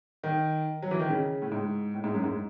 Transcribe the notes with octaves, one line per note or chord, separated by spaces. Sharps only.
D#3
F#3
E3
D#3
C#3
A2
G#2
A2
G#2
F#2
G#2